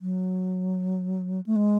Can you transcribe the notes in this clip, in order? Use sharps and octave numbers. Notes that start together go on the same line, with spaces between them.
F#3
A3
G#3